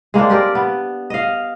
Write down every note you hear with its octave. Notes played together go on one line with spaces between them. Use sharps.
G#3 A#3 C4 D4
G4 A#4 D5
B3
D#5 F5